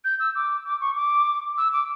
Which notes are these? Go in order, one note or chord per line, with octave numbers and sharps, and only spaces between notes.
G6
E6
D6
D6
C#6
D6
E6
D6